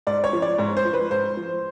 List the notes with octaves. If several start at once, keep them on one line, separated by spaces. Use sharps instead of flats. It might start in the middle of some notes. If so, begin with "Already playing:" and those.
G#2 D5
C#5
F3
D5
G#2 C#5
C5
F3
B4
G#2 C5
F3